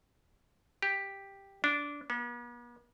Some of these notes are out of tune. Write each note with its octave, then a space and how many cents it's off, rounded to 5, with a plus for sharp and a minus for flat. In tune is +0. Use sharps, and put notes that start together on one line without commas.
G4 +5
D4 -15
B3 -45